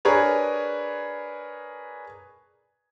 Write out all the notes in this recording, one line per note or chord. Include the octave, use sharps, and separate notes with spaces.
D4 G#4 A#4 B4 C#5